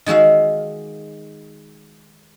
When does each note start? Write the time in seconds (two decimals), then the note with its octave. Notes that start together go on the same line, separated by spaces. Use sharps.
0.06 D#3 G#3 F#4 E5 F5